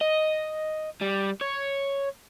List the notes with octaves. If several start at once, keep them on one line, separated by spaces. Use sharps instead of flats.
D#5
G3
C#5